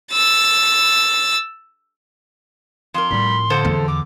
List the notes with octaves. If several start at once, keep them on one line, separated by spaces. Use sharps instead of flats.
E6 A6
F2 A#4 C6
A2 G3 B5
F2 D3 A4 C5
E2
D6